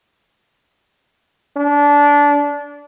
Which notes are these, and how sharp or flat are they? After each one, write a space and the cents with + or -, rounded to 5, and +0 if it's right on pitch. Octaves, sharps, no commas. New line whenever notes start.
D4 -20